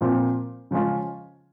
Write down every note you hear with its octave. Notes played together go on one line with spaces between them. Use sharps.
A#2 F3 C4 F4
C#3 F3 G#3 C#4 F4